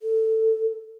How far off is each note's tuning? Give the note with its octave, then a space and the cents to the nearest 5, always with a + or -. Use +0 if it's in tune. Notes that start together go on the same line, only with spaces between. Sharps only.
A4 +15